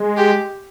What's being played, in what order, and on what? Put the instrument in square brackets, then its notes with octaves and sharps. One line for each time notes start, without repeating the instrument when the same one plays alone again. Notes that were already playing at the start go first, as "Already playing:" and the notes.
Already playing: [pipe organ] G#3
[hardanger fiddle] G4